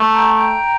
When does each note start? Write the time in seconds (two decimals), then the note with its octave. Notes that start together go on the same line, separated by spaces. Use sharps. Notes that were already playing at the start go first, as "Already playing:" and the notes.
Already playing: A3
0.11 G5 A#5
0.34 G5 A#5